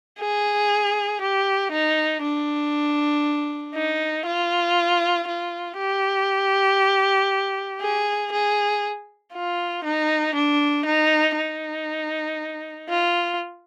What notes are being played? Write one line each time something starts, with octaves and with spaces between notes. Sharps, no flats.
G#4
G4
D#4
D4
D#4
F4
F4
G4
G#4
G#4
F4
D#4
D4
D#4
D#4
F4